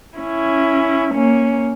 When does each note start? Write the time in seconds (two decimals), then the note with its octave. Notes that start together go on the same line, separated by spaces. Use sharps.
0.18 C#4 E4
1.14 A#3 C#4